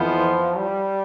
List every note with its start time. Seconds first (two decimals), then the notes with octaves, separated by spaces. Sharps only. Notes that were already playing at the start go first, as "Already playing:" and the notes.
Already playing: F2 E3 F3 B3 F4 C5
0.57 G3